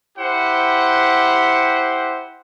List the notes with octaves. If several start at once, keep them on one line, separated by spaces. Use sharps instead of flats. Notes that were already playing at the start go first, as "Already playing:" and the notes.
E4 G4 C5 F#5